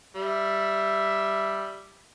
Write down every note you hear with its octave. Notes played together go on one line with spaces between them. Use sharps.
G3 E5